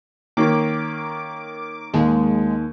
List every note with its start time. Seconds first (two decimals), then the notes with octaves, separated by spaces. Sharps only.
0.37 D#3 A#3 C#4 D6
1.94 D#2 G#3